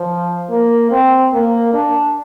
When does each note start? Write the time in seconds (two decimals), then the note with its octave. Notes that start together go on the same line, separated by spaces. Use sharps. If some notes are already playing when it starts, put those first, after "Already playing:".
Already playing: F3
0.50 A#3
0.91 C4
1.33 A#3
1.74 D4